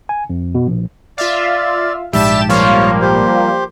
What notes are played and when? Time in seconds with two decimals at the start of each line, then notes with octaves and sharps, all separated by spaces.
0.09 G#5
0.30 F2
0.55 B2
0.67 A#1
1.18 F4 D5 E5 F5
2.13 A#1 G#2 G3 G4 E5 A5 E7
2.49 F3 G3 A#3 F4 C#5 F5
3.01 G4 C5